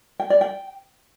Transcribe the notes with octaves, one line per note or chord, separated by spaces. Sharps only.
G5
D5
G5